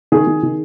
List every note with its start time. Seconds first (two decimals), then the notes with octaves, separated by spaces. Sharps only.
0.12 D#3 G#4
0.27 D#3
0.43 D#3